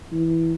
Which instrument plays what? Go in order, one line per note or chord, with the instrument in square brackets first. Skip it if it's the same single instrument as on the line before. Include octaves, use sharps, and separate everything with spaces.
[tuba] E3